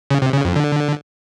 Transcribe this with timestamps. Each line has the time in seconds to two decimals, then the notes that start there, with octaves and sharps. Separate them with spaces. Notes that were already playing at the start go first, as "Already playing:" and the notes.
0.11 C#3
0.22 C3
0.33 C#3
0.45 F2
0.56 D3